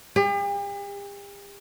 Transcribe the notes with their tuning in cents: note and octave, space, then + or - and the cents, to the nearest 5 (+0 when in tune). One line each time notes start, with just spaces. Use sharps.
G4 +45